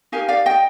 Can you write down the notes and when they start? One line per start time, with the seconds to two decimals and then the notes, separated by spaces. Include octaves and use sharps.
0.12 D#4 G4 A#4 F5 G#5
0.29 D5 F5
0.46 D#5 G5